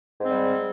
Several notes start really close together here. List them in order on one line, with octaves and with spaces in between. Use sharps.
G#2 C4 G3